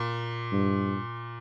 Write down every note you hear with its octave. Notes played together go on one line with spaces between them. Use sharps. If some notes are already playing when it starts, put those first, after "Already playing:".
Already playing: A#2
G2